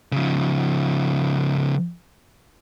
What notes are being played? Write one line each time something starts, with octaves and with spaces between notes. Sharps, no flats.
C#3 F3